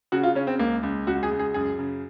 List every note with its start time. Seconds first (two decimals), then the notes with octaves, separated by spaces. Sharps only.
0.12 C#3 F#4
0.23 F4
0.35 C#3 C#4
0.47 C4
0.59 C#2 A#3
0.83 C#2
1.07 C#2 F#4
1.23 G#4
1.31 C#2
1.39 G#4
1.54 F#2 G#4
1.79 C#3